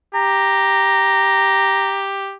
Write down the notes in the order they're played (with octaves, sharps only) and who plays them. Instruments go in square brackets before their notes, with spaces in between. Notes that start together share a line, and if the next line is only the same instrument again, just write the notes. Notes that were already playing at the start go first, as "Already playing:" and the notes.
[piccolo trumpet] G4 [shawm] A#5